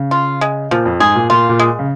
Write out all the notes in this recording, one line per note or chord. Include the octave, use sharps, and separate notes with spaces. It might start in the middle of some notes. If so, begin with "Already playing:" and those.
Already playing: C#3
F4
G#3
A#2 F3
F2
G#2 G#4
A#2
A#2 F4
A#2
G#3
C#3